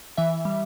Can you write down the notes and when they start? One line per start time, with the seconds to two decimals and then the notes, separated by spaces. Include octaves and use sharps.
0.17 E3 E5
0.45 G3